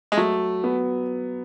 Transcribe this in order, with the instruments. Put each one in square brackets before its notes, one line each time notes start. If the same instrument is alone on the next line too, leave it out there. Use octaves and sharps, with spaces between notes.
[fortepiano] G#3
[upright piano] F#3 [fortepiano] A3
[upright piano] B3